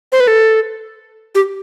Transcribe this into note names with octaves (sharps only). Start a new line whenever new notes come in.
C5
B4
A4
G4